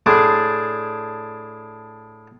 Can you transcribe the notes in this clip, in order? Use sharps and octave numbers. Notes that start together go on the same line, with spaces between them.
A2 D4 G#4 D5 C6